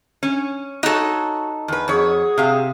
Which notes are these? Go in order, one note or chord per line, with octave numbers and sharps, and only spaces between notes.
C#4
D#4 F#4 A4 C#5
E2 B4
F2 F#4 G#4 C#5 D#6
C3 F5